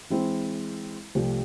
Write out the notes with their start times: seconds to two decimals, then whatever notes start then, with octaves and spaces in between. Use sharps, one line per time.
0.10 E3 G#3 C4 E4
1.15 C2 C3 F3 A3 C4